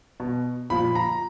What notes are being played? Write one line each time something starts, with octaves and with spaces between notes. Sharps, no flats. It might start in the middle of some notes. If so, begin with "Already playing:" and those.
B2
A#2 F3 B5
A#5